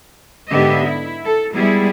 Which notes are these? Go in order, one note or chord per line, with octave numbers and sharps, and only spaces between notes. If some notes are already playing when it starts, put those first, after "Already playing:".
G#2 D3 B3 G4 D#5 E5
E4
A4
G3 G#3 B3 E4 G#4